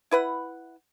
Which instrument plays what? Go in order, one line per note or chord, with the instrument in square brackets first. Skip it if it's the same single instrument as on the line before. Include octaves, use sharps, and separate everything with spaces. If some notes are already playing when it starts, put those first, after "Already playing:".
[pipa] E4 B4 F#5